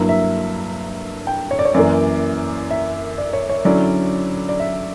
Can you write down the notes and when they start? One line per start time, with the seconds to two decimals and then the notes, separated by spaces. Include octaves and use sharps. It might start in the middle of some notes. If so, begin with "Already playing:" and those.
Already playing: G2 F#3 A#3 E4
0.09 E5
1.27 G5
1.51 C#5
1.59 D5
1.65 C#5
1.74 F#2 E3 A#3 D5
2.71 E5
3.18 D5
3.33 C#5
3.50 C#5
3.65 D3 F#3 C#4 E4 D5
4.49 D5
4.60 E5